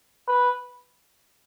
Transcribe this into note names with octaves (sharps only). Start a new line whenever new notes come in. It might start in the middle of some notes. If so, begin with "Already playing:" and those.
B4